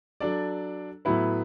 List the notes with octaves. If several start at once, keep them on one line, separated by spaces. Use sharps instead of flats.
F#3 D4 A4 D5
A2 F#3 B3 E4 B4